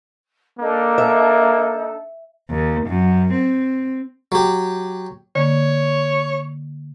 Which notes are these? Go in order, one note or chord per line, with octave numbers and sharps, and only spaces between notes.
A#3 D4 D#4 A4
E5
D#2
F#2
C4
F#3 G4
D3 A#3 C#5